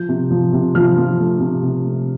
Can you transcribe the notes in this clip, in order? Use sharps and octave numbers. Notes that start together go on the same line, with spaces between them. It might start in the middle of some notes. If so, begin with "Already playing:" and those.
Already playing: F3 G6
C3
F3
C3
F3 F6
F3
A3
C3
C3
A3